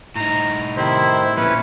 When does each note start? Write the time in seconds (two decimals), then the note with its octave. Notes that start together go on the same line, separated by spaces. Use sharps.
0.16 A2 D#4 A#5
0.77 C3 D#3 E4 C5
1.37 F2 A#2 C#4 E4 B4